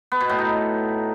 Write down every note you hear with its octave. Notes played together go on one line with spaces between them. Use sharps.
B3
B2
A2
D#4